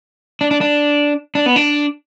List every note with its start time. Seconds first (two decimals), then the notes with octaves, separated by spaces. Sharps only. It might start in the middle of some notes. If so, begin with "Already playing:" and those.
0.41 D4
0.51 D4
0.61 D4
1.35 D4
1.46 B3
1.56 D4